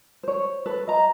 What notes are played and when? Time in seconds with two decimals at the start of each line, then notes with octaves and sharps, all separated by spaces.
0.23 C5 C#5
0.66 A4 B4
0.88 D#5 A#5